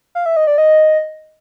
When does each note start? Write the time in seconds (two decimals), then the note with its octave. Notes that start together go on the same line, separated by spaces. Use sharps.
0.15 F5
0.26 E5
0.36 D#5
0.47 D5
0.58 D#5